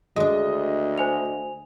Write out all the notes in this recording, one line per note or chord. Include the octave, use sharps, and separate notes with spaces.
D2 G#3 D4 D#5
C5 G#5 F7